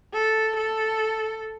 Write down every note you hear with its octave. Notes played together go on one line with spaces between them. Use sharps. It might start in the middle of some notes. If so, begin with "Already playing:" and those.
A4
A4